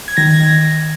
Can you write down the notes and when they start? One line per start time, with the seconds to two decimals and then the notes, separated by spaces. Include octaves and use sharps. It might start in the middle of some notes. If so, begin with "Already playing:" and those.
0.08 G#6
0.17 D#3 A#6
0.31 G#6
0.40 D#3 A#6